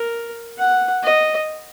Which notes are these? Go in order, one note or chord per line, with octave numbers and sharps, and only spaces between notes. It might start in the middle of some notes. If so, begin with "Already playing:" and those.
Already playing: A#4
F#5
D#5